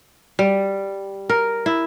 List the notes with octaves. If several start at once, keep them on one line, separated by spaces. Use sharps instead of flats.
G3
A#4
E4